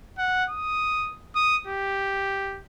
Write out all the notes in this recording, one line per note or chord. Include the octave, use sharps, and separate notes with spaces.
F#5
D#6
D#6
G4